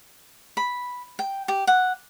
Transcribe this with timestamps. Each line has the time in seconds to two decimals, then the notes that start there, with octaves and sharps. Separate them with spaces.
0.57 B5
1.19 G5
1.48 G4
1.67 F#5